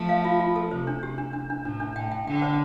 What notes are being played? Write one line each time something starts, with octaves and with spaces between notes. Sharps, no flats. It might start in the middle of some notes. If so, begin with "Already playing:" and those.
Already playing: F3 A3
F5
F4
F4
A4
C3 C5
D4
C3 G4
D4
D4
D4
A2 D4
D4
A2 G5
G5
D3 G5
C5